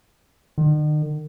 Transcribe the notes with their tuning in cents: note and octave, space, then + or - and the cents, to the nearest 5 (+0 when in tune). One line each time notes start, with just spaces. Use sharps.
D#3 -45